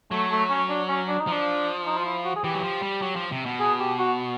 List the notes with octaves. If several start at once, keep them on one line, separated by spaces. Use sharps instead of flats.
F#3 A3
A3
C#4
D4
C#4
D4
D#4
F3 D4
D#4
F4
E4
F#4
G#4
E3 G4
F#3
F3
G3
F#3
F3
C3
B2
G#4
G4
F#4